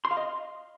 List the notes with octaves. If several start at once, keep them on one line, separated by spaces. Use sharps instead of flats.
C6
F5
D#5